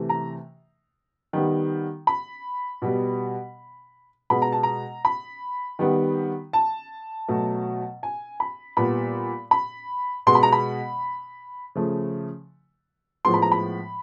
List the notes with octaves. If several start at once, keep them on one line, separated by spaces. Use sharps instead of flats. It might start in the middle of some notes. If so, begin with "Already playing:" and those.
Already playing: C3 E3 A3
A#5
D#3 G3 B3
B5
B2 G3 B3
B2 G#3 B3 B5
A#5
A5
A#5
B5
D#3 G3 B3
A5
B2 F#3 A3
G#5
B5
A#2 G3 B3 B5
B5
B2 G#3 B3 C6
B5
A#5
B5
C#3 F3 A3
A2 F3 G#3 B3 C6
B5
A#5
B5